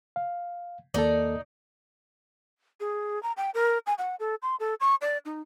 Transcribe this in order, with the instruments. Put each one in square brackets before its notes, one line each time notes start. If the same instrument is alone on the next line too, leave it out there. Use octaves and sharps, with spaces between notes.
[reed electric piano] F5
[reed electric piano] D#2 A#3 A4 [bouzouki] D#4 D5
[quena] G#4
A#5
G5
A#4
G#5
F#5
A4
C6
A4
C#6
D5
D#4